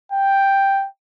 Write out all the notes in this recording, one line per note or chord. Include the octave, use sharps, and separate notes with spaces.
G5